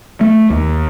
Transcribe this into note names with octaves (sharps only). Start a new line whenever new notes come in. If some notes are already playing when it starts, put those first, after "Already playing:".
A3
D#2